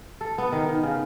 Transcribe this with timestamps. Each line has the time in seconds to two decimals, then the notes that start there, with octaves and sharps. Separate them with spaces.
0.21 A4
0.38 B3
0.52 D#3
0.69 D#3
0.83 C#3